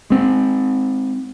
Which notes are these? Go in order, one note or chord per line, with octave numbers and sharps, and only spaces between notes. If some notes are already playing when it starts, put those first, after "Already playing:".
G#3 C4